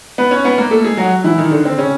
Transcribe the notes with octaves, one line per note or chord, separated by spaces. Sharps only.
B3 B4
C#4 C#5
B3 B4
A#3 A#4
A3 A4
G#3 G#4
F#3 F#4
E3 E4
D#3 D#4
D3 D4
C4
C#3 C#4